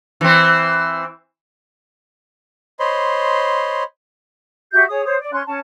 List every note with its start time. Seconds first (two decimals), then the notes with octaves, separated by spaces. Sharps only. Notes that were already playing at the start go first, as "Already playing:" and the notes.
0.21 E3 C4
2.80 C5 C#5 D#5 B5 C6
4.72 F#4 G4 E5 G6
4.89 G#4 C#5 D#6
5.04 C5 C#5 D#6
5.19 D5
5.31 C#4 C6 F#6
5.46 C#4 A5